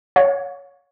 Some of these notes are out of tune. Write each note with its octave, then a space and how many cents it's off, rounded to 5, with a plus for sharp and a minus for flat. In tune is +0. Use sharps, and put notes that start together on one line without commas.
C#5 +5 F5 +45